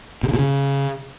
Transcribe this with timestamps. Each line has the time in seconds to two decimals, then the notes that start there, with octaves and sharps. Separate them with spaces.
0.23 B2
0.28 C#3
0.34 A#2
0.39 C#3